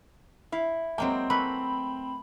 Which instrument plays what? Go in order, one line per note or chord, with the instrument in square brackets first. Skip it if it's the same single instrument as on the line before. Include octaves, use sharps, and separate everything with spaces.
[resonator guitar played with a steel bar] E4 [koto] F5
[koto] F#3 G#3 A#3 [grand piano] C4 G5
[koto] A3 A#3 B4 [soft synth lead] B5